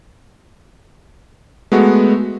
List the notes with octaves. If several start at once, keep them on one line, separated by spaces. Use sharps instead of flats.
G#3 A3 B3 F#4